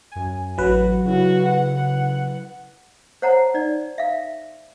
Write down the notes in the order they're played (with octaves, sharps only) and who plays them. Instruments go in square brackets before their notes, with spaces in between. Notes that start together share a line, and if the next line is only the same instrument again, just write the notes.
[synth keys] F#2 G#5
[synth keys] A1 [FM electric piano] F#3 B4 [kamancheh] F#4
[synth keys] C#3 E4 [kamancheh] F#4
[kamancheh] F#5
[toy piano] C5 C#5 F#5 A5 A#5
D#4 D5
E5 F5